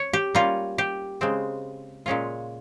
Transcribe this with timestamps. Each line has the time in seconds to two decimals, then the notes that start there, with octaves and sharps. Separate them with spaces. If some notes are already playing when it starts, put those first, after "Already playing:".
Already playing: C#5
0.13 G4
0.35 G3 A#3 C#4 F4
0.78 G4
1.21 C#3 G#3 C4
2.06 A#2 G#3 C#4 F4